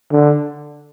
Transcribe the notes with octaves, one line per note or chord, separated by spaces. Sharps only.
D3